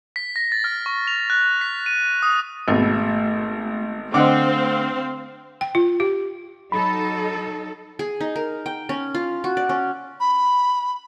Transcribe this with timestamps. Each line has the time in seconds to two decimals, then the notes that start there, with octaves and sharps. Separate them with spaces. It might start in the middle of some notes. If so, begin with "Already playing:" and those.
0.16 B6
0.36 A#6
0.52 A6
0.64 F6
0.86 C#6
1.07 F7
1.30 F#6
1.61 B6
1.86 D#7
2.22 D#6
2.68 G#1 B2 A3
4.14 D3 C4 D#5 F5 F#5 C6 D6
5.61 G5
5.75 F4
6.00 G4
6.72 F#3 D#4 A4 B5
7.99 G#4
8.20 D#4
8.36 A#4
8.66 G5
8.89 C#4
9.14 F4
9.44 F#4
9.57 D5
9.69 C#4
10.20 B5